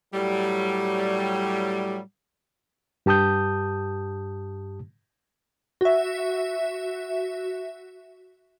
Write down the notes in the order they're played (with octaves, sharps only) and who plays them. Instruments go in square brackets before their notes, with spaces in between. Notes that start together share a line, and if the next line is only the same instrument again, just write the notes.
[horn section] A2 F#3 G3
[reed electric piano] G2 G4 A5 D#6 G6
[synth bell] F#4 E5